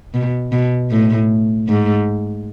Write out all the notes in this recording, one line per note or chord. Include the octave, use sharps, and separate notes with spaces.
B2
B2
A2
G#2